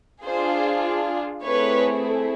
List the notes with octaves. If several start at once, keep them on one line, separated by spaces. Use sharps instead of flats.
D4 F4 G#4 C5
A3 C4 E4 G#4 B4 C#5